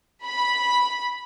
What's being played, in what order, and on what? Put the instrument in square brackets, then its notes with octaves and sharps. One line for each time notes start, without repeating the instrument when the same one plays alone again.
[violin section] B5